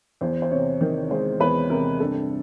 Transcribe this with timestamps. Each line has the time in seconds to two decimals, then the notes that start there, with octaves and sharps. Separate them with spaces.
0.21 E2 C5
0.42 C5
0.51 C3 C#5
0.81 D#3
1.11 G#3 C5
1.40 E2 B4
1.70 C3 A#4
2.00 G2 A4